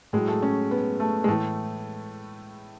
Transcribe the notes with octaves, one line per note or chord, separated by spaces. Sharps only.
A2 F#3 G#3
A3
C#4
B3
A3
G#3
A2 E3 A3